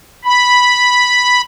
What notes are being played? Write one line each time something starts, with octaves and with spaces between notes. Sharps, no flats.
B5